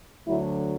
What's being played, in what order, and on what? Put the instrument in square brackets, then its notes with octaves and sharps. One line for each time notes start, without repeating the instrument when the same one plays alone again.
[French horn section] D2 D3 F#3 E4